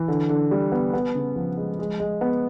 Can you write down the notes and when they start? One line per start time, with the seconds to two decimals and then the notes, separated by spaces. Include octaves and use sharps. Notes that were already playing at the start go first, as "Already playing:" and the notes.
Already playing: E3
0.08 D3
0.29 D3
0.51 G3
0.72 B3
0.94 B3
1.15 C#3
1.36 F3
1.57 G#3
1.79 G#3
2.00 G#3
2.21 B3